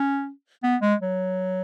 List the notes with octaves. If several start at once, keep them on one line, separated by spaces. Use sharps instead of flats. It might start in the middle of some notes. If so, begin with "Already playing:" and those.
Already playing: C#4
B3
G#3
F#3